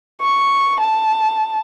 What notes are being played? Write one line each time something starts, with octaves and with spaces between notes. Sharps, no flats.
C#6
A5